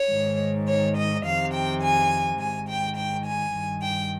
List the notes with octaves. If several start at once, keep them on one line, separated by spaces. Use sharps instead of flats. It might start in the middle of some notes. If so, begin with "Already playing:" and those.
Already playing: C#5
G#2 D#3
C#5
D#5
F2 C3 D#3 F5
G5
G#5
G#2 D#3 G#5
G5
G5
G#5
G2 D#3
G5